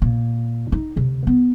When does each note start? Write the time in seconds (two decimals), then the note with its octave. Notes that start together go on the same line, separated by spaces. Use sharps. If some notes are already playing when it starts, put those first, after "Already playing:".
0.02 A#2
0.72 D#4
0.96 D2 C3
1.27 B3